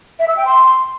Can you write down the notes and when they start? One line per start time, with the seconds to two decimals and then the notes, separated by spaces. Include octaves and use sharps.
0.19 E5
0.28 E6
0.37 G5
0.45 C6